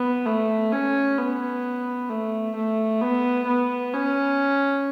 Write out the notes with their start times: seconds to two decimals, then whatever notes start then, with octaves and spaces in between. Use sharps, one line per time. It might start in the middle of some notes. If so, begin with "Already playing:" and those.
Already playing: B3
0.26 A3
0.72 C#4
1.18 B3
2.10 A3
2.56 A3
3.02 B3
3.47 B3
3.94 C#4